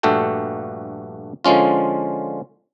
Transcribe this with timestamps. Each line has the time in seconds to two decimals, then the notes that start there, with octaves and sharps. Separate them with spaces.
0.03 A#1 G2 A3 F#4 A4 G5
1.45 D3 F3 G#3 C#4 F4